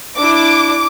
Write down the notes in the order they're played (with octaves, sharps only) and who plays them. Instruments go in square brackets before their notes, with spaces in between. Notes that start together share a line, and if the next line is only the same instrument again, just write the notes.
[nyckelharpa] D4 E4 [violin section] D6